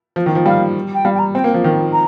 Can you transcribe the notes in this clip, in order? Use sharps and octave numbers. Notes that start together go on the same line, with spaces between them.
F3
D#3
F3
G3 F5
G5
G3 F5
G5
A#5
C4 G5
A#3
F3
D#3
A#5